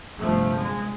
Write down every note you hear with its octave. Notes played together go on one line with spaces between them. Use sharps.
G1 C3 F3 A3
G#3